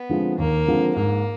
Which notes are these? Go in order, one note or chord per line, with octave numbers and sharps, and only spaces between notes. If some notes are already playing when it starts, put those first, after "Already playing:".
Already playing: B3
D3 F3 G#3 C4
D#2 A#3
D3 F3 G#3 C4
G#2 A#3